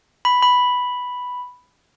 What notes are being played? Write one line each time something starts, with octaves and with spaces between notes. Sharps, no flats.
B5
B5